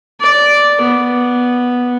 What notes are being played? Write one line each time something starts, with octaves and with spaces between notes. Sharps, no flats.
D5
B3